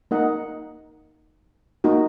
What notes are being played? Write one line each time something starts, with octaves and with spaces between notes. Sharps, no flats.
A#3 D#4 A#4 D#5 F#5
A#3 D#4 F#4